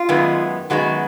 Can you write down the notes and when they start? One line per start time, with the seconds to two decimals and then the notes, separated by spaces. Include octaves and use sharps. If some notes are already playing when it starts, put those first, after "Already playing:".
Already playing: F4
0.09 F#2 D#3 G#3 B3
0.70 F#2 D#3 G#3 B3 F#4